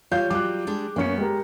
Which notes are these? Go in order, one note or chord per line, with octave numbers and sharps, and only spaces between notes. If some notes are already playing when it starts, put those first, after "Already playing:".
G3 F4 C#5 F5 G6
F#3 G3 F4 D6 F#6
G3 G#3 D4
F#2 A#3 B3 C#4 C#7
G#3 G4 A#4